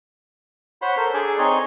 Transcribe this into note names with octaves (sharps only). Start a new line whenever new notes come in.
C5 C#5 F#5 B5 C6
A4 A#4 C5 C6
D4 G#4 A4 D5 G#5
C4 D#4 C#5 D#5 G#5 C6